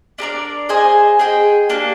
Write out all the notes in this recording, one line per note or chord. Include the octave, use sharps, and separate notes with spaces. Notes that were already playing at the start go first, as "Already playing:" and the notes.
D4 G4 A#4 D5
G#4 C5 D#5 G#5
G#4 D#5 G5
A#3 D4 G4